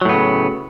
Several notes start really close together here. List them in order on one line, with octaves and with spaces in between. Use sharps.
F#3 A2 B3 C#3